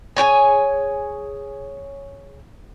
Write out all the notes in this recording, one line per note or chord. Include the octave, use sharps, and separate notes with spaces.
G#4 C#5 G5 G#5